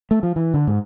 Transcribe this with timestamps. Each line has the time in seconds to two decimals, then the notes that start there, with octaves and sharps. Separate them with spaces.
0.11 A3
0.23 F3
0.36 E3
0.54 D3
0.67 G#2